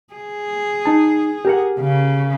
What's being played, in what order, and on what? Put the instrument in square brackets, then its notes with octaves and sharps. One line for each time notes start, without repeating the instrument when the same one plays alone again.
[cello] G#4
[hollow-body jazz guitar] D#4 A5
G4 A#4 F#5
[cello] C#3